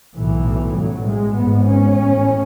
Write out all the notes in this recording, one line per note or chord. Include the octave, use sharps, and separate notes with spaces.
B1 A2 E3
A1 A2 F#3
G#3
G#1 G#2 B3
C#4
A1 A2